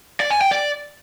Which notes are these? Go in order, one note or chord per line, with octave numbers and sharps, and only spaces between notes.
D5
G#5
G5
D5